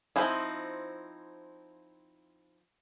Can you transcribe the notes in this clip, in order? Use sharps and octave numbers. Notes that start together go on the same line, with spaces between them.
F3 C4 D#4 E4